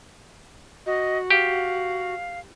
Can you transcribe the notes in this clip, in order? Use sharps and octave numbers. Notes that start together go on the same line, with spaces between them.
F#4 D#5
G4 F5